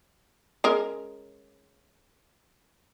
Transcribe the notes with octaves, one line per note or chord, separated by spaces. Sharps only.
G#3 C#4 A#4